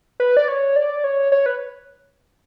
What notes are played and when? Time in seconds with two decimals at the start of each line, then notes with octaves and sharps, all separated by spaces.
0.20 B4
0.37 D5
0.48 C#5
0.76 D5
1.04 C#5
1.32 C#5
1.46 B4